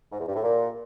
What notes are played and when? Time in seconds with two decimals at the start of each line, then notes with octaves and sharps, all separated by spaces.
0.12 G#2
0.20 E2
0.28 G2
0.36 A2
0.43 A#2